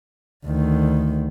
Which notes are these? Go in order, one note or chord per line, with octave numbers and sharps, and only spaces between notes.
D2 D#3